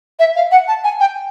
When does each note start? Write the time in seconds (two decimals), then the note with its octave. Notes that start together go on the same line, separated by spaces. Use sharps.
0.19 E5
0.36 F5
0.51 F#5
0.68 A5
0.84 G#5
1.00 G5